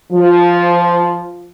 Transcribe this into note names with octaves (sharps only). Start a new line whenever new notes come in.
F3